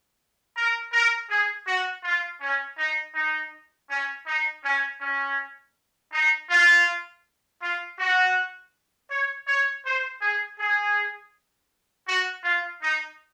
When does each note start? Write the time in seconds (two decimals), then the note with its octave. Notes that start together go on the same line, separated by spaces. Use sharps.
0.56 A#4
0.93 A#4
1.30 G#4
1.67 F#4
2.04 F4
2.41 C#4
2.78 D#4
3.15 D#4
3.90 C#4
4.27 D#4
4.64 C#4
5.01 C#4
6.13 D#4
6.50 F4
7.61 F4
7.99 F#4
9.10 C#5
9.47 C#5
9.85 C5
10.22 G#4
10.59 G#4
12.08 F#4
12.44 F4
12.82 D#4